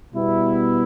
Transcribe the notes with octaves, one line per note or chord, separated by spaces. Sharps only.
B2 G3 B3 E4